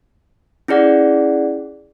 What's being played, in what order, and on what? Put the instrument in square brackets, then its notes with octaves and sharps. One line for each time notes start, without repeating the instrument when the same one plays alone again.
[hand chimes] C#4 E4 G#4 D5 F#5